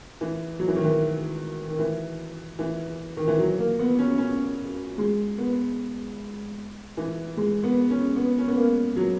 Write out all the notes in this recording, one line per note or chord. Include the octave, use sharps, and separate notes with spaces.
E3
F#3
E3
D#3
E3
D#3
E3
E3
D#3
E3
F#3
A#3
B3
C#4
C#4
G#3
B3
E3
G#3
B3
C#4
B3
C#4
B3
A#3
F#3